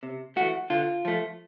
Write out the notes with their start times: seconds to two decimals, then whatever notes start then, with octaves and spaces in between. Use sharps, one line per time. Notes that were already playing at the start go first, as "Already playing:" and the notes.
0.03 C3
0.36 E3 A3 F#4
0.70 D3 F4
1.05 F3 A3